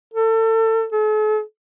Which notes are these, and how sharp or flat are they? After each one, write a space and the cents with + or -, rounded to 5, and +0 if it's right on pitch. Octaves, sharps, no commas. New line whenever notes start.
A4 +30
A4 -45